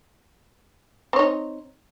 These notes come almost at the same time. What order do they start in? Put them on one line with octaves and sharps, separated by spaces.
C4 C#5 D#4